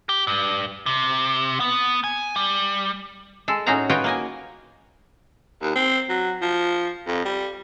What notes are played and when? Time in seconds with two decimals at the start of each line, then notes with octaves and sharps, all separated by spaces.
0.09 G4
0.27 G2
0.86 C3
1.60 B3
2.04 G#5
2.36 G3
3.48 G#3 A4
3.66 A2 C#4 D#4 F#4 G#4 A#5
3.90 F4 F#4 B4 C#5 D#5 G5
4.04 A#3 D#5 G#5
5.62 D#2
5.76 C4
6.09 F#3
6.42 F3
7.07 F2
7.25 G3